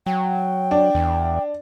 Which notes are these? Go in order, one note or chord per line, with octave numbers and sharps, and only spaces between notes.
F#3 G5
D4
E2